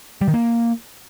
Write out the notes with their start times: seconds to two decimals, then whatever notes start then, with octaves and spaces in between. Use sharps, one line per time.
0.21 G3
0.28 D#3
0.34 A#3